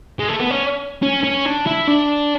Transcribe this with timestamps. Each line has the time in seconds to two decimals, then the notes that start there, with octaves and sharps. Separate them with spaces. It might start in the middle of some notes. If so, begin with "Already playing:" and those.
0.19 G#3
0.29 A3
0.40 B3
0.51 C#4
1.03 C#4
1.24 C#4
1.46 D4
1.67 E4
1.88 D4